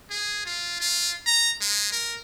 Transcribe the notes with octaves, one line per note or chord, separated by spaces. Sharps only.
G#4
F4
F4
A#5
G#3
A#4